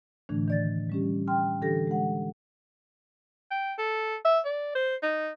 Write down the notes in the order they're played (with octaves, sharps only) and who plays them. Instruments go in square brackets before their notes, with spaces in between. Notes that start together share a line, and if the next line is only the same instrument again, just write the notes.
[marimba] A2 D3 E3 A3 D4
D#3 D5 A6
G3 C#4 G4
G5 C6 F6
D3 E3 D4 G4 A4 A#6
G#3 F#5
[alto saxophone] G5
A4
E5
D5
C5
D#4